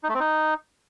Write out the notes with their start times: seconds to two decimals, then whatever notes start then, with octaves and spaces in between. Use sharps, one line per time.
0.04 D#4
0.09 A3
0.14 C4
0.20 D#4